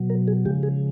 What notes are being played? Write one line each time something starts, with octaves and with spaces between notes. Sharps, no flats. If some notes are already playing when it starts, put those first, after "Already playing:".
Already playing: B2 F#3
A#4
G#4
C#3 F3 G#3 G4
G#4